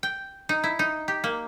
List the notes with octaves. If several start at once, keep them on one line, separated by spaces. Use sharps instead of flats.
G5
D#4
E4
D#4
G4
A#3